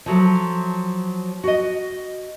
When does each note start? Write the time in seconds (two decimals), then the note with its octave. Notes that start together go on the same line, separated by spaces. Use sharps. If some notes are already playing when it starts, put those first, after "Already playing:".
0.06 F3 F#3 A3
1.44 F#4 D#5